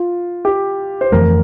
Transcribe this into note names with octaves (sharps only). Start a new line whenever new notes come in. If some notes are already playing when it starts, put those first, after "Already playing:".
Already playing: F4
G4
C5
F2 E3 A3 C4 A#4